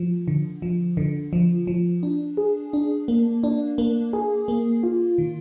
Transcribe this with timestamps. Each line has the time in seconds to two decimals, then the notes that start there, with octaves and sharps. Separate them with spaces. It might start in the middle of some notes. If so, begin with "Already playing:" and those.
Already playing: F3
0.28 D3
0.62 F3
0.97 D3
1.33 F3
1.67 F3
2.03 D4
2.37 G#4
2.73 D4
3.08 A#3
3.43 D4
3.78 A#3
4.13 G#4
4.48 A#3
4.83 F4
5.18 D#3